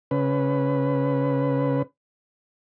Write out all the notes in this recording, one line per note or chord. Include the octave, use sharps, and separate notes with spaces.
C#3 B4